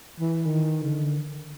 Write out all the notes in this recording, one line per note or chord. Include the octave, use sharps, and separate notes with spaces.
E3
D#3
D3